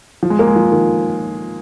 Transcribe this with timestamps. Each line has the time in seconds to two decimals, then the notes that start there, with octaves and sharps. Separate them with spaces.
0.23 F3
0.30 G#3
0.39 A#3
0.47 G#3
0.56 F3
0.72 D#3